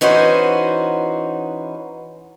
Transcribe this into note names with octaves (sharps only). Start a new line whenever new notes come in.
E3 C#4 D#4 F#4 C5